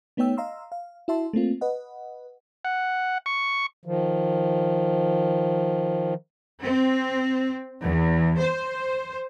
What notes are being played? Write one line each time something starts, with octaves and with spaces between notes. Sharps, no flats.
A3 B3 D#4 C#5 G5 E6
D#5 F5 A#5 C6 E6
F5
E4 F#4 E5 A5 C6
A3 A#3 C4 F4
B4 D#5 F#5
F#5
C#6
D#3 F3
C4
E2
C5